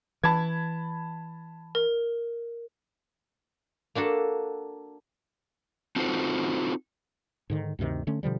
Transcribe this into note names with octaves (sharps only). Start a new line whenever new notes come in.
E3 A5 B5 G#6
A#4
A#3 D4 F#4 A4
C4 D#4 F4 F#4 A4 C5
G#2 D3 D#3
D2 G2 C3 D#3
D3 A3 C#4
B2 D3 F3 G3